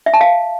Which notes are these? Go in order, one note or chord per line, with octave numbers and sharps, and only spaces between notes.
E5
A5
F5